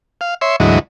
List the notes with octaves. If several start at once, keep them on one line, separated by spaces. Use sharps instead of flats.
F5
C#5 E5 C6
D2 G#2 E3 F#3 D#5